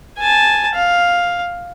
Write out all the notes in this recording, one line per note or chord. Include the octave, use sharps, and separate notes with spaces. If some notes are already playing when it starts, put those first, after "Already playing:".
G#5 A5
F5